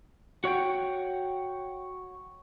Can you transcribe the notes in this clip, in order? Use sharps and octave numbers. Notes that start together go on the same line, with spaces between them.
F#4 C#5 F#5 G5